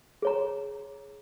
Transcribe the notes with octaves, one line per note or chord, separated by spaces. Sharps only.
G#4 C#5 A#5